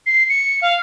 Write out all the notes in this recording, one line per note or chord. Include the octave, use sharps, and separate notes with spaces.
C7
C#7
F5